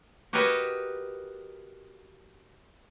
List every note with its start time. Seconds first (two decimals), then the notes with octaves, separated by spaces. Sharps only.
0.33 F#4 G4 A#4 B4 C#5 D#5